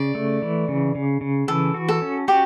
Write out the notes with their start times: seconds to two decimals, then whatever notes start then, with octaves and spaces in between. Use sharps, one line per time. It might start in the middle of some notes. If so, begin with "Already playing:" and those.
Already playing: C#3 D5
0.15 A3
0.42 E3
0.68 C#3
0.95 C#3
1.21 C#3
1.48 E3 A4
1.74 F#4
1.89 A4
2.02 C#4
2.28 F#4 G4